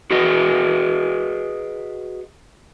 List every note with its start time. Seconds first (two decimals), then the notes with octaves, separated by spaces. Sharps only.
0.11 F#4 G#4 B4 D#5